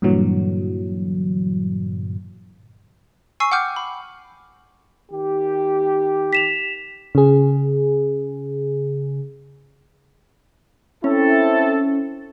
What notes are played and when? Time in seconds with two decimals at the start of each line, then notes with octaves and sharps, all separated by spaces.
0.02 G2 A#2 D3 E3 F#3
3.40 G#5 C#6 E6 C7
3.52 F#5 G5 D6 F6 G6
3.76 B5
5.11 D#3 G4
6.33 B6 E7 F7
7.15 C#3 G#4
11.04 C4 C#4 E4 A4